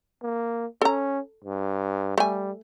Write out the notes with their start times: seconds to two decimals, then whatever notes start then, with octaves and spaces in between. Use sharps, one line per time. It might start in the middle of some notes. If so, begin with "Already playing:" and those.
0.23 A#3
0.81 C#4 A4 A#5
1.44 G2
2.18 G3 A3 G#5